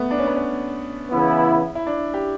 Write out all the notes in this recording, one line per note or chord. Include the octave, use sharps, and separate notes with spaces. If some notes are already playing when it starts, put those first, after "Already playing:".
Already playing: A3 B3
D4
C#4
B3
C#4
C#3 E3 B3 E4
E4
D4
G4